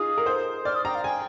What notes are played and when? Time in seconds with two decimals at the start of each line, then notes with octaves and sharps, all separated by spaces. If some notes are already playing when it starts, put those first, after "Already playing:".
Already playing: D#4 F4 G#4 D#6
0.18 A#4
0.26 C5
0.65 D5 F6
0.74 D#6
0.85 G5 A#5
0.94 F5
1.04 G5 G#5